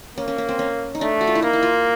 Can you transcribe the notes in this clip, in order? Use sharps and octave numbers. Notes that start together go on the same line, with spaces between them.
A#3 C#4
C#4
C#4
C4
C#4
D#4
A3 D4
F#4
F4
E4
A#3 D#4
E4
F4